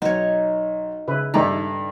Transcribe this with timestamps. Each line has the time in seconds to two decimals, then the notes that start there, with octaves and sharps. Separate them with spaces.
0.02 B1 D#4 C#5
1.08 C#3 E4 B4
1.34 G2 D#3 D#4 E4 A4 D5 A#5